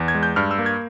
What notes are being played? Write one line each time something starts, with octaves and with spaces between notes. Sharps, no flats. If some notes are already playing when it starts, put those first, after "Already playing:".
Already playing: E2
G#6
G#3
G6
G2 F6
E6
A#3
G#6